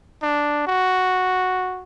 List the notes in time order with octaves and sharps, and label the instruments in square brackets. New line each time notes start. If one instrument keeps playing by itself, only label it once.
[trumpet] D4
F#4